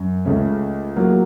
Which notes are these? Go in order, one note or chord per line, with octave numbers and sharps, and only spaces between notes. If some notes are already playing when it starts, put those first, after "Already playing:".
Already playing: F#2
C#2 C#3 A3 C#4
A2 F#3 A#3